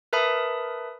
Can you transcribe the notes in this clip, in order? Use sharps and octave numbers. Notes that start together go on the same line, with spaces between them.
A#4 B4 E5 A5 B5 D#6